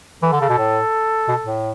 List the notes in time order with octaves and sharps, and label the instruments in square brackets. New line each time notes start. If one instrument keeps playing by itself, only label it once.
[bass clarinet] E3 [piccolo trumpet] A4
[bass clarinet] D3
C#3
B2
A2
B2
A2